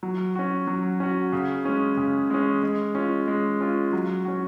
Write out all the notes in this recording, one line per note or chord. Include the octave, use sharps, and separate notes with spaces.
F#3
C#4 F#4
F#3
C#4 F#4
C#3
G#3 C#4
C#3
G#3 C#4
G#3
C#4 F4
G#3
C#4 F4
F#3
C#4 F#4